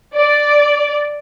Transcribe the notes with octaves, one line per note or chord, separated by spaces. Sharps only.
D5